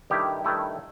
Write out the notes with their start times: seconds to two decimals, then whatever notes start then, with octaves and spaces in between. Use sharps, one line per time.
0.10 G2 D#3 A3 E4 G4
0.44 G2 D#3 A3 E4